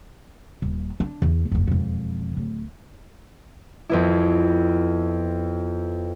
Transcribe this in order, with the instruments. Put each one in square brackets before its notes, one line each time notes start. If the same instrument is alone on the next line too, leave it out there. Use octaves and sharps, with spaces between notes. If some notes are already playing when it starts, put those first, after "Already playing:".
[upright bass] D#1
D4
E2
F#1 E2
E1 F2
D1
[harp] F2 B3 E4